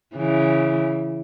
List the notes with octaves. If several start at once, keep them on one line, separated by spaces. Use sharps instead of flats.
C#3 E3